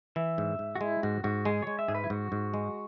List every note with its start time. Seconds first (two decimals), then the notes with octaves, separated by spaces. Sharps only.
0.16 E3 E5
0.38 G#2
0.59 G#2
0.75 F#4
0.81 G#3 E4
1.03 G#2 F#4
1.24 G#2 F#4
1.45 G#3 G#4
1.62 G#3 C#5
1.79 E5
1.88 G#2 G#4
1.95 B4
2.04 E4
2.10 G#2 F#4
2.32 G#2
2.54 G#3